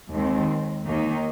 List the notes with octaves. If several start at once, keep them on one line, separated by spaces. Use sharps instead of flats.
D#2 D#3 G#3 C4
D#2 D#3 A#3 D#4